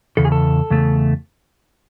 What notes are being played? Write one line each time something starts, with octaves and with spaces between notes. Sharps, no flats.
E2 C#3 A4
G#4
A4
E2 C#3 A3